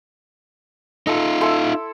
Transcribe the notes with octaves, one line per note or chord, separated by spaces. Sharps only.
D#4 F4 A4
E4 A4 C6